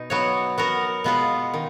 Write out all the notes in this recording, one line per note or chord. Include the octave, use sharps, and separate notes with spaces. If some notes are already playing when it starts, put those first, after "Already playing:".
Already playing: B2 D#4
F#3 B3 F#4 C#5
B3 F#4 A#4
B2 G#3 B3 F4 B4
D#3